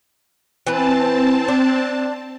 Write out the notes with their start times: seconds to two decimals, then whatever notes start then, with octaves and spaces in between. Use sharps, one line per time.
0.67 E3 C4 B4 A5
1.48 D4